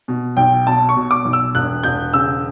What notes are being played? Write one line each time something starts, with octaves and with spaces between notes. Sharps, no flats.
B2
B1 G5
B2 A5
C#6
B2
D6
B1
E6
E1 F#6
E1 G6
C#3 E6